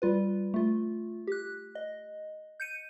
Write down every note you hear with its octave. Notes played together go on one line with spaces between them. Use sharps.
G3 F4 B4
A3 F4
G4 F#6
D#5
G6 C#7 D#7